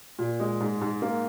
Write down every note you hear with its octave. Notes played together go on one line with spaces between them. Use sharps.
A#2
G#3
G#2
G#2
A#3